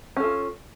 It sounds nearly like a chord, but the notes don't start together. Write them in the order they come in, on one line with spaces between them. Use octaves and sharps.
C#4 A4 F4